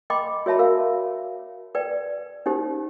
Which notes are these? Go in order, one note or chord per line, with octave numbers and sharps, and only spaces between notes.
D#5 G5 B5 C6 D6
F#4 C#5 E5 A5 B5
A#4 F5
B4 D5 G5
C#4 D#4 G4 C5